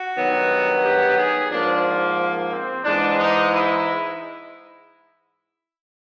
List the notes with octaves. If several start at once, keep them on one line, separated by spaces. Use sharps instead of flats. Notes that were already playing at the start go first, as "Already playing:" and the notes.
Already playing: F#4
G2 D#3 F#3 B3
G4
G#4
G#2 F3 A#3 D4
C4
G#2 E3 G#3 D4
D#4
E4